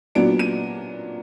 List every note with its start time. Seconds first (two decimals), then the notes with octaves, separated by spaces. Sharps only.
0.15 A#2 F#3 B3 D4 D7
0.39 D#7